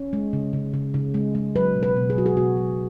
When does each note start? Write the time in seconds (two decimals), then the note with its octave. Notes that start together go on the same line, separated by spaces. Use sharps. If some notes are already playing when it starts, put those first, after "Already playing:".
Already playing: C#4
0.13 G#3
0.33 C#3
0.53 C#3
0.74 C#3
0.94 C#3
1.14 G#3
1.35 G#3
1.55 F#3 B4
1.76 B2
1.83 B4
1.96 B2
2.10 G#4
2.16 F#3 F#4
2.26 G#4
2.37 B2 F#4
2.57 F#3